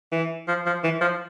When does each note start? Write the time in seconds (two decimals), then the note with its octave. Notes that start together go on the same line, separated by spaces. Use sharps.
0.12 E3
0.48 F3
0.66 F3
0.84 E3
1.01 F3